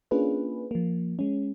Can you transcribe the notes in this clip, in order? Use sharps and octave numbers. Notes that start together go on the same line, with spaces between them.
A#3 C#4 D4 F4 G#4 B4
F3 A#3
G#3 C#4